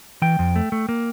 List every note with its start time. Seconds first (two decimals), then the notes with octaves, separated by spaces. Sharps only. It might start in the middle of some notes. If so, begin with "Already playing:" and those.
0.22 E3 G5
0.39 F2
0.56 A3
0.72 A3
0.89 A#3